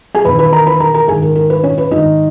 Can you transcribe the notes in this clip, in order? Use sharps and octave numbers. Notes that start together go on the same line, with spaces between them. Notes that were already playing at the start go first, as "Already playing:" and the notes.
G#4 G#5
E2 D#3 B4 B5
B4 B5
A#4 A#5
B4 B5
A#4 A#5
A#4 A#5
G#2 D#3 G#4 G#5
A#4
A#4
B4
C#4 C#5
B4
G#2 D#3 D#4 D#5